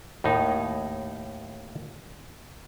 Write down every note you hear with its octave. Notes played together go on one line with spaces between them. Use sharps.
D#2 A2 D#4